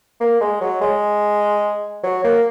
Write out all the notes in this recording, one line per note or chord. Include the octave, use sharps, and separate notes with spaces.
A#3
G#3
F#3
G#3
F#3
A#3